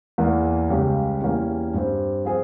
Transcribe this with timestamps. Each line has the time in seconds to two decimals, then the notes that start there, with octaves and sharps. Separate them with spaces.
0.18 E2 E3 A#3
0.70 C#2 C#3 G3 C#4 G4
1.21 E2 E3 A#3 C#4 G4
1.74 G2 G3 C4
2.25 F3 C4 F4 G#4